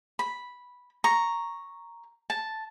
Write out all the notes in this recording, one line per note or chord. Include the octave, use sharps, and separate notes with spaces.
B5
A#5 C#6
A5